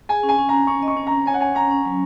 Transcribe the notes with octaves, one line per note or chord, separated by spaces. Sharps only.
G#4 G#5
C#4
G#5
C#4
C#4 A#5
C#4 C#6
D#5
C#6
C#4
A#5
C#4
C#5 G#5
F#5
C#4 G#5
C#4 A#5
C#4
F#3